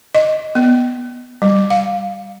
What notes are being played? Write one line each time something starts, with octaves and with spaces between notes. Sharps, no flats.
D#5
B3
G3
F5